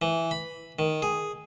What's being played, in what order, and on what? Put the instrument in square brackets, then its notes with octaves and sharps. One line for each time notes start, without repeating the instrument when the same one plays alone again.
[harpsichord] E3
B5
D#3
G#4